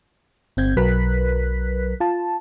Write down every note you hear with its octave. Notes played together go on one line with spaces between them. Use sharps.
G1 C4 G6 G#6
B1 F#3 A#4 B4 F#6 B6
F4 A5